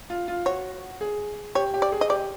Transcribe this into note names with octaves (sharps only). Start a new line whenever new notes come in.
F4
F4
F#4 C#5
G#4
G4 C#5
G4
D5
G#4
D#5
G4 D5